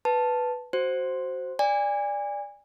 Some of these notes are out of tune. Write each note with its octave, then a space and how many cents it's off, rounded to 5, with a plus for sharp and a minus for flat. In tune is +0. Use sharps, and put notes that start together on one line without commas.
B4 +0 A5 +0
F#4 +10 C5 +0
D5 +0 G#5 -30